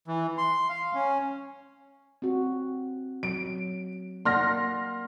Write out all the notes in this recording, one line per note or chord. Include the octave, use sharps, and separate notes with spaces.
E3
C6
F5
C#4
C4 F#4
F#3 D7
A#3 D5 F#5 C6 F6 A#6